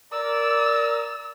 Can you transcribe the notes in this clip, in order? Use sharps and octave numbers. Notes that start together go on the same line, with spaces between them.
A#4 D5 E6